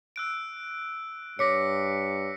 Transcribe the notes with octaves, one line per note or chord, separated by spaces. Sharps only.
E6 F#6 D7
G2 C#5 D6 A#6 B6 C#7